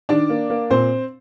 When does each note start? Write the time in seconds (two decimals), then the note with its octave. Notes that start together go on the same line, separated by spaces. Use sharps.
0.09 D#3 D4 D5
0.30 A#3
0.50 A#3
0.70 A#2 C4 C5